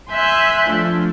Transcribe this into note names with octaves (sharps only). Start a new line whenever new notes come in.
E5 G#5 C6 E6 F#6 G6
F3 A3 D4 F4